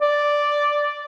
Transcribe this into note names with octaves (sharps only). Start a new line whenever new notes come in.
D5